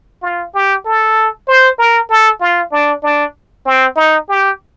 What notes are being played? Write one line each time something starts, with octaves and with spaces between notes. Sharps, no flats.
F4
G4
A4
C5
A#4
A4
F4
D4
D4
C4
D#4
G4